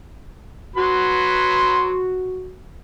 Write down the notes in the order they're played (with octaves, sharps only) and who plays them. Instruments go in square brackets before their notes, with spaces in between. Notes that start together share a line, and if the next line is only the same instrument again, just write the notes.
[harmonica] F#3 B4 C6 [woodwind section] F#4